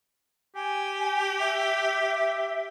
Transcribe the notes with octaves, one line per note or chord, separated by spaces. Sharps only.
G4 G#5
E5